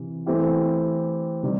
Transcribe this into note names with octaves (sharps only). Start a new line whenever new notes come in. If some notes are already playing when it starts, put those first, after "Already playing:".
Already playing: C3 E3
E3 A3 C4 E4 G4
C3 D#3 G3